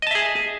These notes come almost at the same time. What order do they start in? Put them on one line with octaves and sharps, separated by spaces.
D#5 A5 E5 G#4